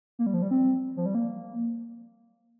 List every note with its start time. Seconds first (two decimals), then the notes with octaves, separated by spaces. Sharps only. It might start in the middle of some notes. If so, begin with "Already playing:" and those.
0.19 A#3
0.26 G3
0.34 F3
0.42 G3
0.51 C4
0.96 F3
1.06 G3
1.15 A#3